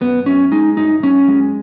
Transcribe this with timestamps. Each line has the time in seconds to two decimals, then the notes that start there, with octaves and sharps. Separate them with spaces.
0.01 F#2 B3
0.26 F#2 C#4
0.52 G#3 D#4
0.77 F#2 D#4
1.03 F#2 C#4
1.28 G#3